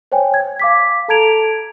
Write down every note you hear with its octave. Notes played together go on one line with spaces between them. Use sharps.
C5 C#5 G5 G#5
G#6
F5 D6 B6
A4 A5 A#5 G#6 D7 F7